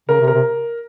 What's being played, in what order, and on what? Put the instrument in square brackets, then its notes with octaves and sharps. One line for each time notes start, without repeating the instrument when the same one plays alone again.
[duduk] C#3 [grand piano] A#4
[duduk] C3
[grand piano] A#4
[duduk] C3